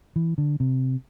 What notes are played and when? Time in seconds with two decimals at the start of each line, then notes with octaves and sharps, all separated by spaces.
0.16 E3
0.38 D3
0.60 C3